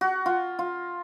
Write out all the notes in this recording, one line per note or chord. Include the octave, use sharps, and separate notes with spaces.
F#4
F4
F4